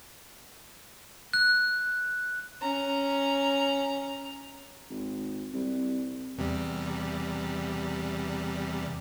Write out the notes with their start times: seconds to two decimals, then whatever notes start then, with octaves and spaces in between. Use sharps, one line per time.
1.33 F#6
2.61 C#4 A#5
4.90 G#1
5.54 C2
6.38 E2 C3 G3